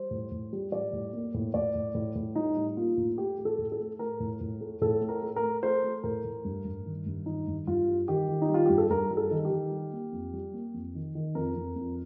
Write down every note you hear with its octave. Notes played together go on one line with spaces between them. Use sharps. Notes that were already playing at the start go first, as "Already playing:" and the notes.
Already playing: G3 C5
A2
A2
G3
G3 D5
A2
A#3
A2
A2 D5
A2
A2
A2
G3 D#4
G3
A#3 F4
A2
A3 G4
A3
A4
A2
A4
A3
A3 A#4
A2
A2
A3
A2 A4
A3
A#4
A3
A#4
A3
A3 C5
A3
A2 A#4
A2
G2
G2
D#3
G2
D#3 D#4
G2
G2 F4
G3
D#3 G4
D#3
D#4
G3
F4
G2 G4
A4
G2 A#4
G3
A4
D#3
G4
D#3
G3
A#3
F2
G3
A#3
F2
D#3
D#3
F2 A#4
F2
F2